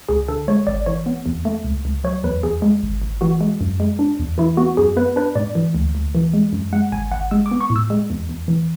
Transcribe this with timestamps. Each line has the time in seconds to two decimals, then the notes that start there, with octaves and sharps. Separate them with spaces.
0.09 C#2 G#4
0.28 D3 A4
0.48 G#3 C#5
0.67 G#1 D5
0.86 E3 C#5
1.06 B3
1.26 E2
1.45 A3
1.64 C#2
1.85 C#2
2.04 F#3 C#5
2.24 E2 B4
2.43 E2 G#4
2.62 G#3
2.83 G#1
3.02 G#1
3.21 E3 F#4
3.41 G#3
3.61 F#2
3.80 G#3
3.99 D4
4.19 E2
4.38 E3 E4
4.57 B3 F#4
4.77 F#2 G#4
4.97 B3 B4
5.16 D4 B4
5.35 G#2 D5
5.55 E3
5.75 D2
5.95 D2
6.15 E3
6.33 G#3
6.53 F#2
6.73 G#3 F#5
6.92 G#1 G#5
7.11 G#1 F#5
7.31 G#3 E6
7.46 D6
7.52 B3
7.61 C#6
7.70 A2
7.76 E6
7.90 G#3
8.10 E2
8.29 E2
8.48 E3